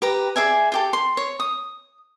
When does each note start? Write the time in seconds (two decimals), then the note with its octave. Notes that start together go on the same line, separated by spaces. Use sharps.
0.02 G4 B4 A#5
0.36 G#4 D5 E5 G#5
0.72 F4 G4 A4
0.93 C6
1.17 C#5
1.40 D#6